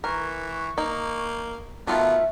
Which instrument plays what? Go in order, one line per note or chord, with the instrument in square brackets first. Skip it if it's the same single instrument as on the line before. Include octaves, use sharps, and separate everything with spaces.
[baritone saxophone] E3 [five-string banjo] A#4 [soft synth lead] C#6
[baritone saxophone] A#3 [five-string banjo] D#4
[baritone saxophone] B2 [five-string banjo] D#3 A3 F4 [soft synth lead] E5